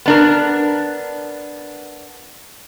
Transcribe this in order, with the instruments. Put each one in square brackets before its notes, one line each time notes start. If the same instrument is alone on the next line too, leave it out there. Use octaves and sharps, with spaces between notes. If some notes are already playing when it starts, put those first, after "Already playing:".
[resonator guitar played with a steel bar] B3 D4 A#4